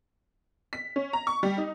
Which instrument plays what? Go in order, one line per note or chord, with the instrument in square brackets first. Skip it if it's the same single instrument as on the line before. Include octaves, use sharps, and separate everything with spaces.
[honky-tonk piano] B6
C#4
A#5
C#6
G3
D#4